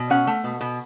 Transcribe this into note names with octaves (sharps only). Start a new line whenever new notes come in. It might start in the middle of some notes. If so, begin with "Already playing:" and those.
Already playing: B2
C#4 F#5
A3
B2
B2